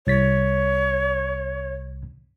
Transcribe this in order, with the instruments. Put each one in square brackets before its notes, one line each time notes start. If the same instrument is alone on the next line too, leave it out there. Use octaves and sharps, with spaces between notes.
[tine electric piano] C2 A6 B6 [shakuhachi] C#5